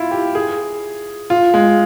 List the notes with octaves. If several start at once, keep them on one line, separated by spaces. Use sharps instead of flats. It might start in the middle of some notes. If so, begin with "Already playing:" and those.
Already playing: E4 F4
G4
G#4
F4
G#3